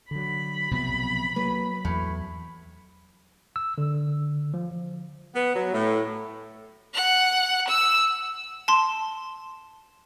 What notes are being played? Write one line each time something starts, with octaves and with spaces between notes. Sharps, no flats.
D3 F#3 B5
B1 C3 F3 F#3 B3
F#3 A#3 B4
E2 A2
E6
D3
F3
B3
F#3
A2
F#5
E6
A5 C6